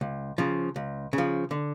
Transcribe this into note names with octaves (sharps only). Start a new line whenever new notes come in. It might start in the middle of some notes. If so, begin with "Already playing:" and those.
C#2
C#3 F3
C#2
C#3
F3
D3